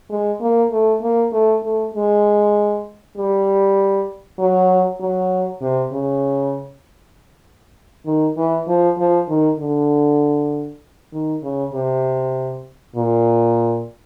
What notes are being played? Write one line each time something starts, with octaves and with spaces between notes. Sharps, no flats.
G#3
A#3
A3
A#3
A3
A3
G#3
G3
F#3
F#3
C3
C#3
D#3
E3
F3
F3
D#3
D3
D#3
C#3
C3
A#2